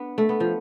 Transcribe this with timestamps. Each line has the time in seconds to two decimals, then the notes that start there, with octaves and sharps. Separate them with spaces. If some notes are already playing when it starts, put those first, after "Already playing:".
Already playing: B3 D4
0.18 A3
0.29 B3
0.40 F3